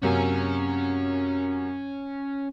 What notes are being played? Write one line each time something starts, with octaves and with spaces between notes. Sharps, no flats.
F#2 C3 A#3 C#4 G#5